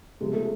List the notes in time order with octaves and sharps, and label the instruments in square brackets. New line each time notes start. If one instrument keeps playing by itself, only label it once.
[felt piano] C#2 C3 F3 G#3 B3
[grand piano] A3